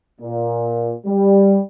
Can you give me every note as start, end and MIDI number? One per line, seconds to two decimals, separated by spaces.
0.21 0.93 46
1.06 1.60 55